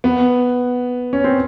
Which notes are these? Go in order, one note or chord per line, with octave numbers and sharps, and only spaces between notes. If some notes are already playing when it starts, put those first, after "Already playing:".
B3
C#4
C4